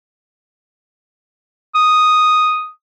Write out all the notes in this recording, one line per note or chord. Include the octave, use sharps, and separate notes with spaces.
D#6